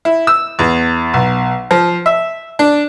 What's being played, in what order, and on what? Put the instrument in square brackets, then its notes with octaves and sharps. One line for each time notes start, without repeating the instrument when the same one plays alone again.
[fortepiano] E4
E6
E2
B1
F3
E5
D4